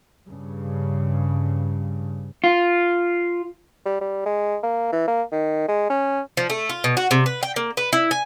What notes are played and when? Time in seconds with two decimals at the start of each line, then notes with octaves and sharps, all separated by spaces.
0.28 G2 C#3
2.44 F4
3.86 G3
4.01 G3
4.26 G#3
4.63 A#3
4.92 E3
5.07 A#3
5.32 D#3
5.68 G#3
5.90 C#4
6.37 F3
6.50 A3
6.69 F4
6.84 B2
6.97 F#4
7.11 C3
7.26 B4
7.43 G5
7.56 A#3
7.77 B4
7.93 E4
8.11 G#5